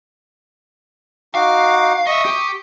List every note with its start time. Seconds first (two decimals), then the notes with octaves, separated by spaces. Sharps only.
1.35 D#4 F#4 F5 D6
2.07 D#5 E5 C#6 D#6
2.25 G4